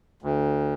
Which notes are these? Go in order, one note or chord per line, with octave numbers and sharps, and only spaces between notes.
D2